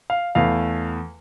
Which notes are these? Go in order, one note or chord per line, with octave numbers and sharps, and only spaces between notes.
F5
E2 E3 A3 F5